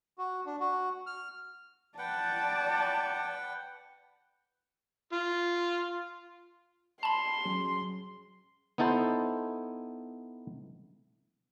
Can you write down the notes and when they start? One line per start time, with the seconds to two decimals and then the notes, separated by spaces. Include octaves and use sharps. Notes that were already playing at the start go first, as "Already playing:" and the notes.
0.18 F#4
0.46 D4
0.60 F#4
1.07 F6
1.98 B4 D5 F#5 G5 A5
5.13 F4
7.03 A5 B5 C6
7.45 F#3 C#4 G#4
8.78 B3 D#4 E4 A4 C5